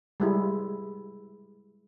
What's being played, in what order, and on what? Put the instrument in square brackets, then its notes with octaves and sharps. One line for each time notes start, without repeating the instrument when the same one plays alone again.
[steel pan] G3 G#3 E4